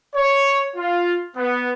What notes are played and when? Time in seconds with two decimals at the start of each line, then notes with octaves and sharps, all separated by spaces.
0.15 C#5
0.76 F4
1.37 B3